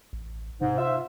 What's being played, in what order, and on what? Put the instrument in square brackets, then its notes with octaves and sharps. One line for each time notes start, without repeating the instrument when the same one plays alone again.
[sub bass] A1
[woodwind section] G#2 [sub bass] C3
[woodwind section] F4 C5 E5